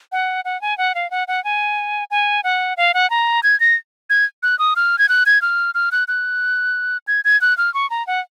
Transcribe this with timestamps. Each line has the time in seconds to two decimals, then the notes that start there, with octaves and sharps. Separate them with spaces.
0.12 F#5
0.45 F#5
0.62 G#5
0.78 F#5
0.95 F5
1.11 F#5
1.28 F#5
1.44 G#5
2.11 G#5
2.44 F#5
2.77 F5
2.94 F#5
3.10 A#5
3.43 G#6
3.60 A#6
4.10 G#6
4.43 F#6
4.59 D#6
4.76 F6
4.99 G#6
5.09 F#6
5.26 G#6
5.42 F6
5.75 F6
5.92 F#6
6.08 F#6
7.08 G#6
7.25 G#6
7.41 F#6
7.58 F6
7.74 C#6
7.90 A#5
8.07 F#5